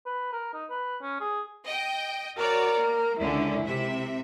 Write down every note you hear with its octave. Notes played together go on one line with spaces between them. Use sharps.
B4
A#4
D#4
B4
C#4
G#4
D#5 G5
F#4 A#4 C#5 D5
A#3
C#2 D3 C#4 E4
C3 E5